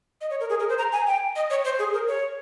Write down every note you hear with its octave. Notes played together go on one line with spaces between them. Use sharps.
D#5
C#5
A#4
G#4
A#4
C5
A#5
G#5
G5
D#5
C#5
C5
G#4
A#4
C#5